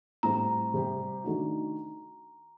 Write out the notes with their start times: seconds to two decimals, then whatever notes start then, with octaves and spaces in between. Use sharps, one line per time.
0.23 A2 G3 C4 A#5
0.74 C3 G3 C4 G4
1.24 D#3 A3 D4 F#4